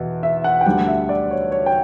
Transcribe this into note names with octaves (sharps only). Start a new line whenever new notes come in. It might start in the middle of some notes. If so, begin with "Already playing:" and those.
Already playing: E2 B2
E5
F#5
G5
D2 D3 G3 F#5
E5
D5
C#5
C#5
G5